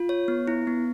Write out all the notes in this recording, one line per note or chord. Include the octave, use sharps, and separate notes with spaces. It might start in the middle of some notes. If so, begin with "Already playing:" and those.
Already playing: F4
C#5
B3
E4
B3